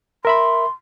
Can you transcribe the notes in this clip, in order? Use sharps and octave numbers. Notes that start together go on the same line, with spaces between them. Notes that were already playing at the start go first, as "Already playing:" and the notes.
A#4 E5 B5 C6